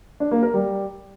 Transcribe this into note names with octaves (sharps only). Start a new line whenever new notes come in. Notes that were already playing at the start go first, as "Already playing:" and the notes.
D4
A#3
A#4
G3